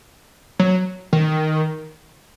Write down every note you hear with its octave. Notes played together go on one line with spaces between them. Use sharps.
F#3
D#3